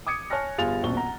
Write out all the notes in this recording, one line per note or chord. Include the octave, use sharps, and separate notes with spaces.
D6 D#6 G#6 C#7
C#5 G#5 A5 F6 F#6 A#6
G1 G3 F4 G#4 A6 F7
D#1 A#1 B2 C4 C#6 G7
F#5 A#5